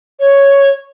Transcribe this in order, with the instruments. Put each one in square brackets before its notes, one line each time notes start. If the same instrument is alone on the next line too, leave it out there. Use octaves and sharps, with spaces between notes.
[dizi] C#5